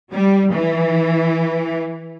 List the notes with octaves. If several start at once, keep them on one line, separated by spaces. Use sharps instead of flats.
G3
E3